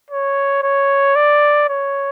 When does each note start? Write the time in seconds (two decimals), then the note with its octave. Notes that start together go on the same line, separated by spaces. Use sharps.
0.11 C#5
0.63 C#5
1.16 D5
1.69 C#5